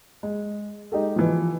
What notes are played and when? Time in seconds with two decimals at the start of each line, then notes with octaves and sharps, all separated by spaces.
0.23 G#3
0.92 G#3 D#4 G4 A4
1.16 E3 F3